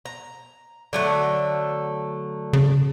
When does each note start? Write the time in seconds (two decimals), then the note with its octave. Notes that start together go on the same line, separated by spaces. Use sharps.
0.05 A#5
0.93 D3 F#3 A3
2.53 C#3